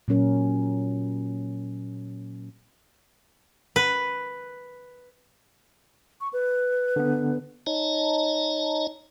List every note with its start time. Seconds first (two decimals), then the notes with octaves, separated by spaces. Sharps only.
0.08 A#2 F#3 C#4 A#4
3.76 B4
6.21 C#6
6.33 B4
6.96 D3 B3
7.67 D#4 C#5 D#5 A5 A#5